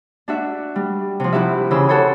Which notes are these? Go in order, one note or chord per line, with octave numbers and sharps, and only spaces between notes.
D4 F#4 E5
G3
C3 F3
E4 F#4 G4 E5
C#3 E3 C5 E6
F#4 A4 C5 C#5